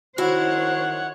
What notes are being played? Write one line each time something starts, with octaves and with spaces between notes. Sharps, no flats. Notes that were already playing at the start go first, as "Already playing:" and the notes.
D#3 E4 F#4 C5 C#5 F#5